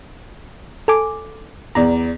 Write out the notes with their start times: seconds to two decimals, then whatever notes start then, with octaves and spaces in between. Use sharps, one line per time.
0.88 A4 G#5 D6
1.75 E2 D5 A#5